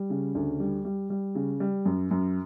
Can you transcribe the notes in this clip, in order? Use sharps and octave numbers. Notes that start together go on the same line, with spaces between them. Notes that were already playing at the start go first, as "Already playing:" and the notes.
Already playing: G3
C#3
D2
G3
G3
G3
C#3
G3
F#2
F#2